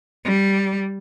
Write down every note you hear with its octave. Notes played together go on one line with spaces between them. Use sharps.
G3